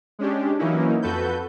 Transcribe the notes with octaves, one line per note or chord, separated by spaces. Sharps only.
G#3 C#4 D4 G4
E3 F#3 A#3 C#4 D#4 E4
F2 F#4 A4 B4 G6